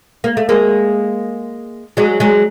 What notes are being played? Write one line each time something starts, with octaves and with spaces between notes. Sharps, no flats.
A#3
A3
G#3 A#3
F#3 G#3
F#3 G#3